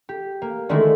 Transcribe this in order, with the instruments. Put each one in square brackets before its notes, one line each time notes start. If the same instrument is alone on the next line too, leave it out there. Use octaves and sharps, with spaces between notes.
[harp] G4
A#3
D3 D#3 G#3 A3 D4 E4